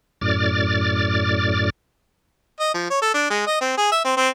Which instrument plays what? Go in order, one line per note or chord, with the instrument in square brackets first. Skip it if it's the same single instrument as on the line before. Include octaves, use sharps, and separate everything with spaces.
[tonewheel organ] F#2 A2 D5 D6 F6 A6
[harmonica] D#5
F3
C#5
A4
D4
G#3
D#5
C4
G#4
E5
C4
C4